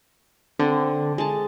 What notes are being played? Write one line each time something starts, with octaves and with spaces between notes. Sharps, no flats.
D3 C4
G#3 A5